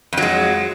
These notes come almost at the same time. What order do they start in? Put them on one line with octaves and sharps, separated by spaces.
F2 F#3 G#3